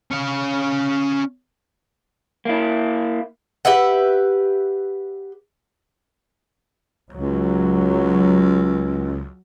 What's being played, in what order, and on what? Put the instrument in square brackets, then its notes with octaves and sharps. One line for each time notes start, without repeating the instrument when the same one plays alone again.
[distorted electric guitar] C#4 F5
[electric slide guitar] A#3 E4
[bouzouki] G4 B4 E5 F#5
[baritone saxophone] C#2 [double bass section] F#3